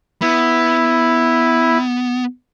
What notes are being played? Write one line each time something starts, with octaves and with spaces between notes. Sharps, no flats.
B3 E4